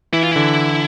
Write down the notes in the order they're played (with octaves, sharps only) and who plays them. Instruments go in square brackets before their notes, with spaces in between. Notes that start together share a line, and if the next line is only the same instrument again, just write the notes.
[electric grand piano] E3 [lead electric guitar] E4
[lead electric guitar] F4
[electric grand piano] D3 [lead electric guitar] E4